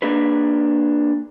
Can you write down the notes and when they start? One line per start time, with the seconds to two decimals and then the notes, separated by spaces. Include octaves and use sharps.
0.02 A#3 D4 G#4 B4